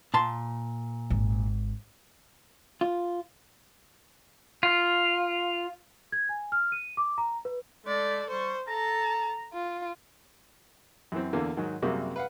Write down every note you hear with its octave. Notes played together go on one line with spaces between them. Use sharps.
A#2 A5 C6
G#1
F4
F4
G#6
G#5
F6
D#7
D6
A#5
B4
G#3 A3 A4 D5
G3 C5 C#6
A4 A5 A#5
F4
F#2 E3 C4
E2 D3 A#3
G#2 D#3 F#3
F#2 C3 G3 A#3 F#4 G#4
B4 F5 F#5